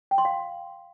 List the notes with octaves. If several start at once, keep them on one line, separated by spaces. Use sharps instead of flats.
G5
C6
F5